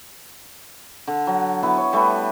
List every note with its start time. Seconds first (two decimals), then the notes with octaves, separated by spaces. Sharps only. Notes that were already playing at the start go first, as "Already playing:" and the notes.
1.07 D3
1.27 F#3
1.63 B3 E4 A5
1.77 C#5
1.93 G3 A3 B3 B4